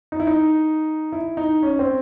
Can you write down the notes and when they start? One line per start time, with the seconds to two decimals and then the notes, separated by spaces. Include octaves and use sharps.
0.12 D#4
0.20 E4
0.27 D#4
1.12 E4
1.37 D#4
1.62 C#4
1.79 C4